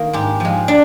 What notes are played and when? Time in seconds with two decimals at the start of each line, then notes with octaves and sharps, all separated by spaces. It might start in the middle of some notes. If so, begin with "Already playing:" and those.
Already playing: D#3 A#3
0.13 G#2 G4
0.40 F3 G#3
0.68 D4